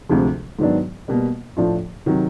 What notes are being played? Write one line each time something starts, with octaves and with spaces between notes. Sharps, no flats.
D2 C3 F3 G#3
G#2 D#3 F#3 B3 D4
B2 G3 A#3
A2 F3 A3 D4 F4
C3 D#3 F#3